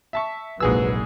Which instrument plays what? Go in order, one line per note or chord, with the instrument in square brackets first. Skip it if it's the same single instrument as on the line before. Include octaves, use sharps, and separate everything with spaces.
[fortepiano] E5 A5 C#6
[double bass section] F1 A#1 F#3 [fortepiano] G#2 G#4 E6 [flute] B4